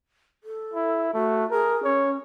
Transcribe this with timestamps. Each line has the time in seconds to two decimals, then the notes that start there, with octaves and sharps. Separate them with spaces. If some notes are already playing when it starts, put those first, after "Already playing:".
0.44 A4
0.74 E4
1.14 A3 F#4
1.51 G#4 A#4
1.84 C#4 C#5